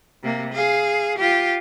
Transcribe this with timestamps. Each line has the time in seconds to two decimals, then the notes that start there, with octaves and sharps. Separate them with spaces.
0.23 C3 A#3
0.54 G#4 F5
1.19 F4 G4